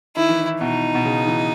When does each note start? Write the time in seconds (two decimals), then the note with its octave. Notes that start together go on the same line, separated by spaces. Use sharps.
0.16 D#3 E4
0.29 E3
0.41 D#3
0.61 B2 D#4
0.95 B2
1.05 C#3
1.27 E3